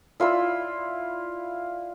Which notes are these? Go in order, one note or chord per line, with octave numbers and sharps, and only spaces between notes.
E4 F4 D5 E6